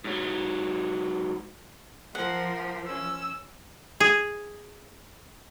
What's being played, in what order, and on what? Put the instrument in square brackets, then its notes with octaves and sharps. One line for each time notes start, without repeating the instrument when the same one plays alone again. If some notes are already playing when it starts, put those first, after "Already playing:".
[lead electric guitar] G#2 F#3
[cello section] F3 [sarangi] A#4 [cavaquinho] F#5
[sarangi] C#4 [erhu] E6
[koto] G#4